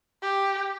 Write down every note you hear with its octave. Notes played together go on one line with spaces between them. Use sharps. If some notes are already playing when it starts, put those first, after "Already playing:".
G4